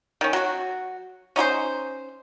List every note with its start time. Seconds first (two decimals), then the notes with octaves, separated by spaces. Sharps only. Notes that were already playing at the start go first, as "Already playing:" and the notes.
0.21 D#3 C#4
0.33 F#3 F#4
1.36 C#4 D#4 G4 C5